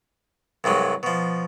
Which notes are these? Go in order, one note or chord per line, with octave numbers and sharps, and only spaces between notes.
C2 G2 F#3 G#3
B2 F3